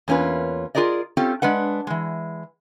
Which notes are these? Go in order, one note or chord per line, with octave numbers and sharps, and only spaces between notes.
E2 A#3 C#4 F4 B4
F4 G#4 A#4 D5 D#5
C4 C#4 F4 G4 A4
G#3 D4 B4 F#5
E3 G#3